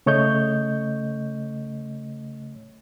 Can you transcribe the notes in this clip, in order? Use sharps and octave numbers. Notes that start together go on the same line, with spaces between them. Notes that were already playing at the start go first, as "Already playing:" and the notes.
C#3 A3 C#5 D#5 G6